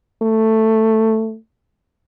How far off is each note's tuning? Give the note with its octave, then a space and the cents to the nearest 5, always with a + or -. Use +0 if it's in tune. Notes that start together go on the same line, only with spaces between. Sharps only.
A3 +10